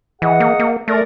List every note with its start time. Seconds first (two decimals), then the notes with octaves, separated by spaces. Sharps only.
0.22 E3 G#4 D#5 F#5
0.40 A#3
0.60 A#3
0.88 A3 A#4 D5